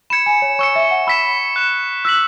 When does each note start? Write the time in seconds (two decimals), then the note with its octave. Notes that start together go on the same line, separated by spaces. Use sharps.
0.10 B5 G#6 C#7 E7
0.26 G#5
0.42 C#5
0.59 C#5 C#6 E6 C#7
0.76 E5
0.91 F#5
1.07 B5 E6 B6 E7
1.56 F#6 E7
2.05 E6 F#6 B6 F#7